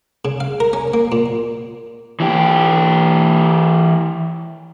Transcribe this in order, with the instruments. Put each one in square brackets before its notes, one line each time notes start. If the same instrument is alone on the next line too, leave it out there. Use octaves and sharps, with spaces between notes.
[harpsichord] C#3
F5
A#4
C#4
A#3
A#2
[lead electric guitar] E3 G4